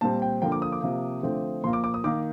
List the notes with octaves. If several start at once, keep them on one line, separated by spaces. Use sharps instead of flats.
A#2 G3 C4 A5
G5
D3 F3 A#3 G5
D6
D#6
D6
C3 F3 A#3
D3 F3 A3 C4
A#2 F3 A#3 C6
D6
D6
D#6
D#3 A#3 D6